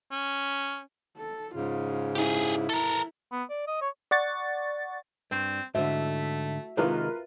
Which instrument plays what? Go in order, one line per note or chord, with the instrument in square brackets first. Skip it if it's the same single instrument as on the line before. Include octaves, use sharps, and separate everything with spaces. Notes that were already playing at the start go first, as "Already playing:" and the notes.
[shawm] C#4
[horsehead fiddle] A4
[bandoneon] G#2 C#3 [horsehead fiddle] F4
[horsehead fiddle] E4 [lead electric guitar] G4 G#4
[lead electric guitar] A4 A#4
[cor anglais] B3
D5
D#5
C#5
[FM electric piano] D5 F#5 C#6 A6
[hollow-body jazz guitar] G2 [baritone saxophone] C4
[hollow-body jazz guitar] G#2 D3 [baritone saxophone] A3 [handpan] F#4 E5
[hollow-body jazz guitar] C3 D#3 G#3 [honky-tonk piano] F4 A#4 B4